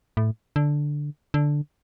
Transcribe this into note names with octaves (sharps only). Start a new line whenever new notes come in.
A2
D3
D3